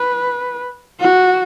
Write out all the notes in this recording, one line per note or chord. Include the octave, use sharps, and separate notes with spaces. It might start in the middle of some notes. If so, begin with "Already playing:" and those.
Already playing: B4
F#4